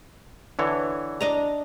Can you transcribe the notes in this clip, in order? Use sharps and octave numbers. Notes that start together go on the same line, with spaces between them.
D3 E3 C#5
D4 D#5 A#5